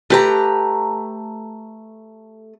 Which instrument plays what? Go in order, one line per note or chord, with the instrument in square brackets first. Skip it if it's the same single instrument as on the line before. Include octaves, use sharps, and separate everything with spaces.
[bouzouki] A3 A#5 [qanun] G4 B4